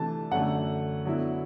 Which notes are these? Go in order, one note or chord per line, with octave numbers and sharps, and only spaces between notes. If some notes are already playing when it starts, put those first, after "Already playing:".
Already playing: C3 E3 A3 D4 A5
F#2 D3 A3 F#5
D3 F#3 B3 E4